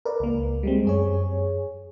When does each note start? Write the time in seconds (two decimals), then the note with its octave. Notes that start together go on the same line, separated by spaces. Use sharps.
0.05 A#4 B4 D5
0.20 C#2 A#3
0.63 G3 G#3 C4
0.85 F#2 G#4 C#5